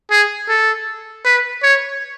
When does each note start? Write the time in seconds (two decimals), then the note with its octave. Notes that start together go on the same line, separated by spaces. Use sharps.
0.11 G#4
0.49 A4
1.25 B4
1.63 C#5